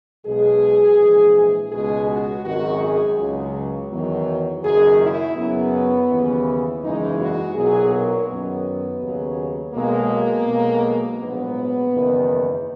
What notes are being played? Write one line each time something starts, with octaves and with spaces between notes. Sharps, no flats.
B1 B2 G#3 G#4
A#1 G#2 E3
C#2 B2 G#3 G#4
F#4
G#1 F#2 D#3 G#3 F#4
G#4
C#2 C#3 F#3
E2 D#3 F#3
F#1 F#2 D#3 F#3 G#4
E4
F#2 C#3 F#3 B3
D#2 C#3 E3
F#1 E2 C#3 E3 G#3 D#4
F#4
B1 A#2 F#3 G#4
A#4
F#2 D#3 F#3 B3
D#2 C#3 F#3
B1 B2 G#3 A#3
B1 B2 G#3
A#1 G#2 F#3 B3
F#1 E2 D#3